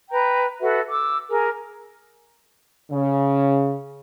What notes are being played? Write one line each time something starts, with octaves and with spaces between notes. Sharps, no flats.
B4 G5 A#5
F#4 A4 B4 E5
D6 E6
G#4 A#4 G#5
C#3